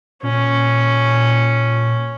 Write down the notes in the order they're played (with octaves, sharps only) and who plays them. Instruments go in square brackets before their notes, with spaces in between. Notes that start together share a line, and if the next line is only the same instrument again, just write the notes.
[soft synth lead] A#2 [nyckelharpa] C#4